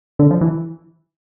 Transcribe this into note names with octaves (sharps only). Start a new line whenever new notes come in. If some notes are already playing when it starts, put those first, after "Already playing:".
D3
F3
E3